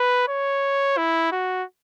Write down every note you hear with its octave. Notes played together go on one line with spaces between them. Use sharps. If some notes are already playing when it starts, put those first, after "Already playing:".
Already playing: B4
C#5
E4
F#4